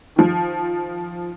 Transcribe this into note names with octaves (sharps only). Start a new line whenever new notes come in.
D#3 F3